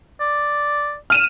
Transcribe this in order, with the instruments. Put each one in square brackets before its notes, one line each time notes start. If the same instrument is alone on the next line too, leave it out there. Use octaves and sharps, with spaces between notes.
[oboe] D5
[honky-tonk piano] F6 D#7 E7